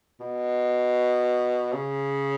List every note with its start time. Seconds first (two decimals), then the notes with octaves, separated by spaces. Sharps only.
0.20 B2
1.73 C#3